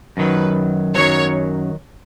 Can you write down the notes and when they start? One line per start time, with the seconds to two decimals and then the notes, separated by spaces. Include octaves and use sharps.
0.17 F#2 D#3 F#3 B4
0.95 F#2 D#3 F#3 C#5